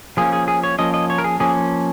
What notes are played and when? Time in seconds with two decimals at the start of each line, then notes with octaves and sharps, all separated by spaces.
0.17 F3 A#3 C#4 G#4
0.33 G#4
0.48 G#4
0.64 C#5
0.79 F3 A#3 C#4 D#5
0.94 D#5
1.10 C#5
1.18 A#4
1.24 G#4
1.40 F3 A#3 C#4 G#4